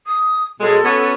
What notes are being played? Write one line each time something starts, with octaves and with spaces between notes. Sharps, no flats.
D#6
B2 F#3 G#3 A4
B3 C#4 F#4